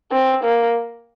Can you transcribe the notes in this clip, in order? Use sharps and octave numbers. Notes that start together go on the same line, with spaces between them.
C4
A#3